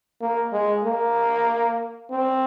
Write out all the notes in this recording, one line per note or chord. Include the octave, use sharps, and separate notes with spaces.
A#3
G#3
A#3
C4